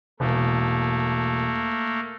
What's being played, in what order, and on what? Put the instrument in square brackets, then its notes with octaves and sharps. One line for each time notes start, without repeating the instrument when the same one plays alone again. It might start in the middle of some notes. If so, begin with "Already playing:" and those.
[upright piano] E1 [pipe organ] A3 A#3